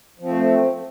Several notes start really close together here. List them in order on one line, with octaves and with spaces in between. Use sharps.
F3 C4 A3